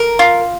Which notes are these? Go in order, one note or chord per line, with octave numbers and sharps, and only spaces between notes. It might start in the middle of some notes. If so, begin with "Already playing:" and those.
Already playing: A#4
F4